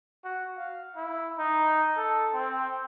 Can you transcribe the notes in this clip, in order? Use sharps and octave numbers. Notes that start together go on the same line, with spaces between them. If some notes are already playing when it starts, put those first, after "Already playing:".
F#4
F5
E4
D#4
A4
C4